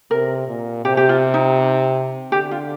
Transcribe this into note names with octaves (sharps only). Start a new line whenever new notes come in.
C3 A#4
A#2
C3 G4
G4
F4
D#4
D3 G4
F4